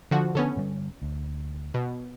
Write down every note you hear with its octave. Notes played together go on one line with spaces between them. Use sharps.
D3 F3 F#4
D3 B3 C#4 D4 A4
G2 D3 G3
D2
B2